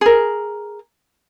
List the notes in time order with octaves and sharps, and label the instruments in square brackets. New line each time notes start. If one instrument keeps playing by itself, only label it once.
[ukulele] G#4 A#4